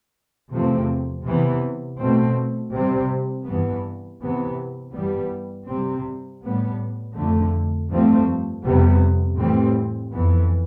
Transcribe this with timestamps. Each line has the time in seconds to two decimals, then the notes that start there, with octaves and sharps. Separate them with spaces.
0.51 E2 C3 F3 A3 C4
1.26 C3 E3 B3
2.00 B2 A3 C4
2.73 C3 G3 C4
3.47 G2 E3 B3
4.21 C3 E3 B3
4.94 G2 E3 G3 B3
5.68 C3 G3 C4
6.42 A2 G3 B3
7.17 F2 D3 A3
7.90 G2 F3 A3 C4
8.64 F2 C3 G3 B3
9.38 A2 E3 G3 C4
10.12 F2 E3 B3